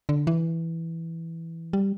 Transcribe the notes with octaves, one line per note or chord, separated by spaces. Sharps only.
D3
E3
G3